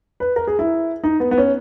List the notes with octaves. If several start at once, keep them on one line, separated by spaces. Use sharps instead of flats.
B4
A#4
G#4
E4
D#4
B3
B3
C#4